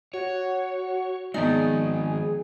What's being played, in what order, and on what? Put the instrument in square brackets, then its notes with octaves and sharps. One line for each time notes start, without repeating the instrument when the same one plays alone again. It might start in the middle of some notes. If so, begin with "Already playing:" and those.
[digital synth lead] F#4 [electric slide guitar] C#5
[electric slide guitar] D#3 G#3 [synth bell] F3 B3 D5 [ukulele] D#4 [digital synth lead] G#4